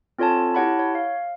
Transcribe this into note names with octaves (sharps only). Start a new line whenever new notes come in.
C4 F4 A4 C#5 G#5 A5
E4 G4 C#5 F#5 A5 B5
C#5
F5